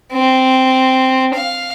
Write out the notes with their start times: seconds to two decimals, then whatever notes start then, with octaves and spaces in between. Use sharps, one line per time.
0.13 C4
1.34 F5